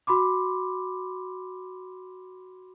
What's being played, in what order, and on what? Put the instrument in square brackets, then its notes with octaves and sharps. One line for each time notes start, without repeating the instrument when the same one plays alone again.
[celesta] F#4 B5 C6 D6